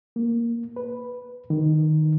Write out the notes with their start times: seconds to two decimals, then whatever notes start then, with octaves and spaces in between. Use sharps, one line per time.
0.16 A#3
0.76 B4
1.50 D#3